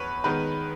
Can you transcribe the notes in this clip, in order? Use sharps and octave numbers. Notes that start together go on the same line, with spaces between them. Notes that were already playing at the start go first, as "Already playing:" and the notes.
Already playing: E2 B4 C#5
D#3 G#3 B3 B4